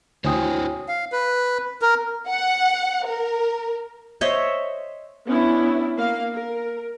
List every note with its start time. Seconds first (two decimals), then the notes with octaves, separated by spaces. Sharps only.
0.24 D2 E4 F#4 C5 C#5 G5 G#5 D#6
0.88 F5
1.12 B4
1.82 A#4
2.28 F#5
3.05 A#4
4.21 C5 C#5 D#5 E5
5.27 B3 C#4 D4 E4
5.96 A#3 F5
6.34 A#4